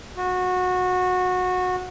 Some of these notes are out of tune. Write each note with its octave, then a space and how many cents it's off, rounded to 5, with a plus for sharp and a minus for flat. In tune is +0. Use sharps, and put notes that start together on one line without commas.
F#4 -20